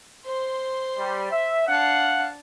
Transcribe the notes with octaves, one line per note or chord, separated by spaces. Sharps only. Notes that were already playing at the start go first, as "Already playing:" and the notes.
C5 C6
G3
E5
D4 F5 F#5 A5